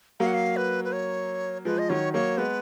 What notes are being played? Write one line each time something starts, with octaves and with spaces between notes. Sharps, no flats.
F#3 A#3 F5
F#5
F5
B4
B4
C#5
F3 G#3 B4
D#5
D#3 F#3 C#5
F#3 A#3 C#5
G#3 B3 B4